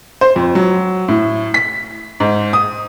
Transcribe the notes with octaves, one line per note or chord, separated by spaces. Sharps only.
C5
F2
F#3
A2
B6
G#2
D#6